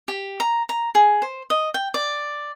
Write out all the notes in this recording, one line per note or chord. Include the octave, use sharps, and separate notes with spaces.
G4
A#5
A#5
G#4
C5
D#5
G5
D5